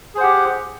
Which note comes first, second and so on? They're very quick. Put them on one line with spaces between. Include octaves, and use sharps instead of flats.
G#4 C5 F#5 G4